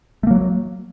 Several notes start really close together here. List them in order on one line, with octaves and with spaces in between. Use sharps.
A3 A#3 F#3